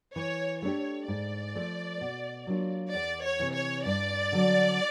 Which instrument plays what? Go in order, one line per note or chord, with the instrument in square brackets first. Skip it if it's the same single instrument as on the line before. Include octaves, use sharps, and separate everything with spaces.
[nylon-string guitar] E3 [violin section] C#5
[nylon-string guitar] A3 D4 G4 [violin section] C#5
[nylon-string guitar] G#2 [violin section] D5
[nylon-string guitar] F3 A3
B2
F#3 A#3 D4 F4
[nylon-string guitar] E2 [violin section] D5
[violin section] C#5
[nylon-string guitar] C3 E3
[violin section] C#5
[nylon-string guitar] G2 [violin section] D5
[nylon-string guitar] D3 F#3